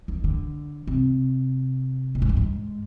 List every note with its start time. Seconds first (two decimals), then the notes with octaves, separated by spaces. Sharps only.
0.08 D#3
0.24 D3
0.87 C3
2.15 A#2
2.22 G#2
2.29 G2
2.37 G#2